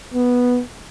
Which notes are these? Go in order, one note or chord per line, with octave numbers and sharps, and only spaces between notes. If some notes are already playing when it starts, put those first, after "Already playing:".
B3